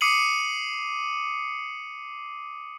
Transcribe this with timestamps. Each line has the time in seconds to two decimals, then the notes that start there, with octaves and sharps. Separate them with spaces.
0.01 D6 D#6 C7 C#7 D#7 F#7